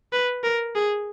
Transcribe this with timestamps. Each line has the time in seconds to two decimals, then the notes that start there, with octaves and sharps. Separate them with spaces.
0.13 B4
0.43 A#4
0.75 G#4